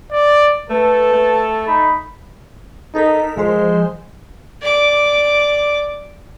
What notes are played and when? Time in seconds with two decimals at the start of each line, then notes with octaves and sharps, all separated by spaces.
0.11 D5
0.70 A3 A4 B4
1.13 A3
1.67 D#4 B5
2.95 D#4 A4 A#4 B6
3.37 F3 G#3 C5
4.62 D5 D6